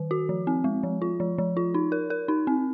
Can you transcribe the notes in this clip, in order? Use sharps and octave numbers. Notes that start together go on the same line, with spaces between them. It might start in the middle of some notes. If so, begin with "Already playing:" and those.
Already playing: D#3
F#4
F3
C4
G#3
F3
F4
F3
F3
F4
D#4
A#4
A#4
D#4
C4